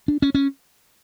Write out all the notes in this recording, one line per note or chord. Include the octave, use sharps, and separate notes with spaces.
D4
C#4
C#4